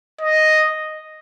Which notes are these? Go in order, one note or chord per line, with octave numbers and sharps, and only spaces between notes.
D#5